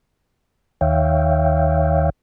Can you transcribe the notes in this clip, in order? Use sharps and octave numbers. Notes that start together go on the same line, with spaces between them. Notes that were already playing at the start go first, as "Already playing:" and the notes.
D#2 D#3 C#5 E5 F5 G5